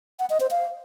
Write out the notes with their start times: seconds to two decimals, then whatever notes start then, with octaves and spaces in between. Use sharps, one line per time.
0.19 F#5
0.30 D#5
0.40 C5
0.51 F5